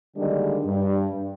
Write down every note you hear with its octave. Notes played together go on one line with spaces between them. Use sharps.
D3 D#3 G3 G#3 A#3 D4
G2